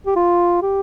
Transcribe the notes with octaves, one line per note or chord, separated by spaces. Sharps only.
G4
F4
G4